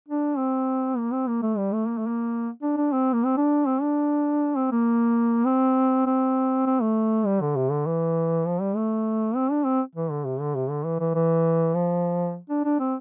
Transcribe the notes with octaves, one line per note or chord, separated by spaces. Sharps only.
D4
C4
A#3
C4
A#3
A3
G3
A3
A#3
A3
A#3
D4
D4
C4
A#3
C4
D4
C4
D4
C4
A#3
C4
C4
C4
A3
G3
D3
C3
D3
E3
F3
G3
A3
C4
D4
C4
E3
D3
C3
D3
C3
D3
E3
E3
E3
F3
D4
D4
C4